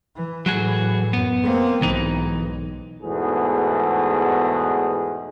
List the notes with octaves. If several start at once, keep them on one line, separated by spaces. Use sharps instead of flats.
E3
A2 E3 F#3 F#4 G#4
F#2 B3
A#3 C4
B1 G#2 E3 D#4
E2 G#2 B2 A3 G#4